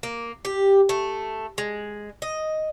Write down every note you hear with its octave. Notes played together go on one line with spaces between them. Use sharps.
A#3
G4
A3
G#3
D#5